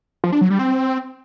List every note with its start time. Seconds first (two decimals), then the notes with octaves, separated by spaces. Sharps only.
0.24 F3
0.32 D4
0.41 F#3
0.50 G3
0.59 C4